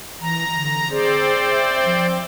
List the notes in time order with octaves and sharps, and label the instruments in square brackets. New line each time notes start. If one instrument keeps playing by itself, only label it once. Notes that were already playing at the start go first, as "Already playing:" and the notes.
[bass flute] E3 [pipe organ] A#5
[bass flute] D3
[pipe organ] C4 C5 D5 [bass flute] G#4
[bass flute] E5
F3